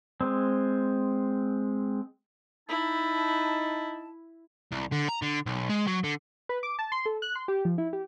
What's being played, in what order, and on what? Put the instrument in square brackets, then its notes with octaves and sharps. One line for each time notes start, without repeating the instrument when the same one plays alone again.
[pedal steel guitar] G#3 C4
[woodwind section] D#4 A5 [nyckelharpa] E4
[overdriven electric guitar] C2
D3
A#5
D3
B1
G#3
F#3
D3
[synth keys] B4
D6
A5
C6
A4
F#6
C6
G4
F3
E4
G4